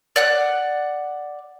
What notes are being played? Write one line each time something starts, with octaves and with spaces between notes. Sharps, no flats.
D5 F#5 F#6